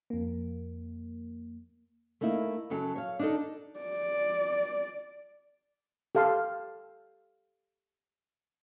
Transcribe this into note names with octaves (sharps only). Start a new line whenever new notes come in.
F2 A#3
A3 A#3 D#4 E4
F#2 C#3 F#3 A4
C#5 F5
D4 D#4 A4
D5
G4 A4 F5 A5 C6